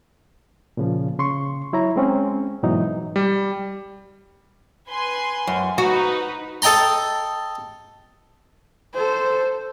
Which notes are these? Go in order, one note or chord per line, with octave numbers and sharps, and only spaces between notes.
A#2 C#3 F3
C#3 C6 C#6
F#3 E4 C#5 A#5
G#3 C4 C#4
G#2 B2 E3 F#3 D#4
G3
B4 G#5 C6
F#2
D#4 F#4 B4
A4 D#5 G5 A#5 C6
A4 C5